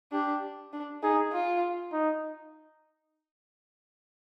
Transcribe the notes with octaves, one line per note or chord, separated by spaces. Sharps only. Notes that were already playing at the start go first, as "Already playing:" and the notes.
D4 G4
D4
D#4 G#4
F4
D#4